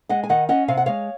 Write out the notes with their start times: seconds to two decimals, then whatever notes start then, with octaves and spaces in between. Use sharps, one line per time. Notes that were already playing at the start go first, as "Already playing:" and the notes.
0.09 G#3 D#5 F#5
0.23 G#5
0.29 D#3 D#5 F#5
0.49 C#4 D#5 F#5
0.68 C3 F5
0.77 F#5
0.86 G#3 C#5 F5